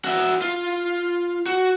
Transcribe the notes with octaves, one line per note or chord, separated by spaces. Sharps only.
F#4 E5
F4
F#4